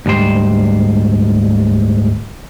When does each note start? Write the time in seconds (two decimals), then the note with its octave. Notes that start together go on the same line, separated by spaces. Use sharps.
0.06 D2 G#2 G3 C5